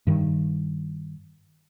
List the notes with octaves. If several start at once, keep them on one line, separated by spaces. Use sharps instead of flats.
G2 D#3